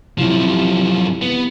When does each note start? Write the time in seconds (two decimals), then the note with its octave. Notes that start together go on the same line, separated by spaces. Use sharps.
0.18 F#2 C3 F3 E4
1.22 B3